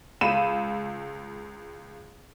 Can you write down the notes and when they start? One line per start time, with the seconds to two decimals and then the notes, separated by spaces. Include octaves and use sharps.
0.21 C#2 B5 D#7 E7